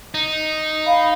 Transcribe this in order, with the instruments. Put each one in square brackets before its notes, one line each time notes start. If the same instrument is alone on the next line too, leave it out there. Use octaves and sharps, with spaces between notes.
[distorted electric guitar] D#4
[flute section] F5 B5